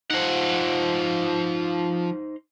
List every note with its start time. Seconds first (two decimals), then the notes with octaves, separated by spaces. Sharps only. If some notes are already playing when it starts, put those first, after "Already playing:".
0.11 F3 D#4 C5 F#5